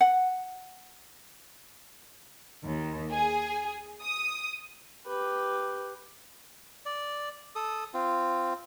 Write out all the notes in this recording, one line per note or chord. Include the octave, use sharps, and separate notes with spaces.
F#5
D#2
G#4
D#6
G4 B4
D5
A4 D#6
C4 F4